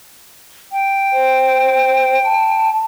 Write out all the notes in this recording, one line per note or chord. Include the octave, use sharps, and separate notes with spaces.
G5
C5
A5